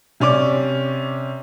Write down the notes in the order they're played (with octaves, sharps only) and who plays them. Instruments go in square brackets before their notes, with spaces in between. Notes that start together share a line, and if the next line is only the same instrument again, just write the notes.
[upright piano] C3 C#4 D5 D6